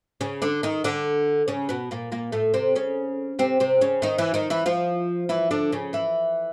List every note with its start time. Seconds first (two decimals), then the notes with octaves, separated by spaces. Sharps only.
0.21 C#3 C#4
0.42 D3 D4
0.63 D#3 D#4
0.84 D3 D4
1.48 C#3 C#4
1.69 B2 B3
1.91 A#2 A#3
2.12 A#2 A#3
2.32 A2 A3
2.54 C3 C4
2.75 C#3 C#4
3.39 C3 C4
3.60 C3 C4
3.81 C#3 C#4
4.02 D#3 D#4
4.18 E3 E4
4.34 D#3 D#4
4.50 E3 E4
4.66 F3 F4
5.29 E3 E4
5.51 D3 D4
5.72 C#3 C#4
5.93 E3 E4